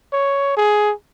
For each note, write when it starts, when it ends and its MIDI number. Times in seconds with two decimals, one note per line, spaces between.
0.13 0.57 73
0.57 0.93 68